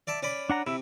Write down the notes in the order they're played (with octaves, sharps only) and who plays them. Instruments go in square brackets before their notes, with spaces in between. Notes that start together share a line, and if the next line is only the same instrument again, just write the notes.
[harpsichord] D5 E5 A5
C#4 D5 B5
[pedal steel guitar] D4 F#5 A#5
[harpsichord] C3 [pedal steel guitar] E4 E5